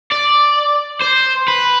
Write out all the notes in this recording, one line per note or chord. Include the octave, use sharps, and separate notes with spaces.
D5
C5
B4